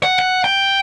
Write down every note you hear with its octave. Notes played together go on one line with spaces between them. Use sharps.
F#5
F#5
G5